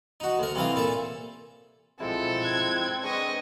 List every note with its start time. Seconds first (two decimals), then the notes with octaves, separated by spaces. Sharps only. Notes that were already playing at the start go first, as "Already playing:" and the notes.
0.20 D#4 F#4
0.39 D2 A#4
0.55 C3 E3 F5 D#6
0.75 A#2 A4 E5
2.00 B1 F3 G#3 C4 E4 A4
2.41 F#6 G#6
3.03 G#3 D4 B4 D#5 C#6